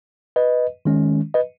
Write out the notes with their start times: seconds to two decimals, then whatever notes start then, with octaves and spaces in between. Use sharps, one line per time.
0.36 B4 D#5
0.85 D#3 G#3 C#4
1.34 B4 D#5